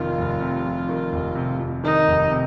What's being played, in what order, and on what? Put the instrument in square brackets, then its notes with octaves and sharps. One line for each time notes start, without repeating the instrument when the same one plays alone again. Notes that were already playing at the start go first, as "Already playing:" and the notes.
Already playing: [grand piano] F1 F2 C3 D#3 [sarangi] F4
[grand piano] F1
C3
F2
D#3
F1
C3
F2
[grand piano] D#3 [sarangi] D#4
[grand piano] F1
C3